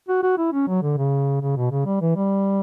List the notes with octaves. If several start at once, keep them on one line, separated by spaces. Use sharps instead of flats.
F#4
F#4
E4
C#4
F#3
D3
C#3
C#3
B2
C#3
G3
E3
G3